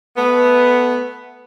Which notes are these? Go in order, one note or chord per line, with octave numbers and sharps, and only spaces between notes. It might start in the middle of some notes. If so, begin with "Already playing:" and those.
A3 B3